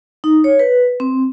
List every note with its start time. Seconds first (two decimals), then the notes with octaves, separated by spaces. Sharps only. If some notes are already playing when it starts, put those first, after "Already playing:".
0.24 D#4
0.44 C#5
0.59 B4
1.00 C4